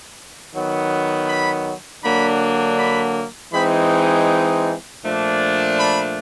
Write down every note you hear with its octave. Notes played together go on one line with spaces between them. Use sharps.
D#3 F#3 B3
B5
D3 F#3 A#3 D4 B5
B5
E3 G#3 C4 D#4 B5
A#2 F3 A3 D4
B5